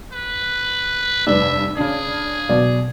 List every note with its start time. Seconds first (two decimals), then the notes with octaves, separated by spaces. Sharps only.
0.13 B4
1.27 F1 G2 B4 D5 E5
1.77 C#3 D4 G#4
2.49 B2 F#3 D5